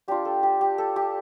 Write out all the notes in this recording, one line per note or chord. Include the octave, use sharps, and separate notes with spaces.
G3 D4 F4 G4
A4
G4
G4
A4
G4